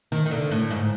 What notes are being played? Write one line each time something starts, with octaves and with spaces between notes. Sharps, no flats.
D#3
D#3
D3
A2
G#2